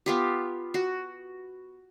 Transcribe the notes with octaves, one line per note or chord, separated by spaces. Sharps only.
B3 F4 G4
F#4